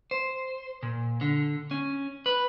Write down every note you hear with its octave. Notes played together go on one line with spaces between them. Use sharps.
C5
A#2
D3
C#4
B4